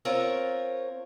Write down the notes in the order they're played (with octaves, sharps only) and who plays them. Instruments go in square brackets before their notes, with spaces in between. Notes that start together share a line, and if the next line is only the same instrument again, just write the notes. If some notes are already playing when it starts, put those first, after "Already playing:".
[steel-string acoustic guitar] C4 F4 A#4 C#5